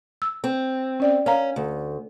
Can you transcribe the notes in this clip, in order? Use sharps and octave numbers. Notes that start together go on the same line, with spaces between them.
E6
C4
C#4 D5 G5
C#4 A#4 F5 A#5
D2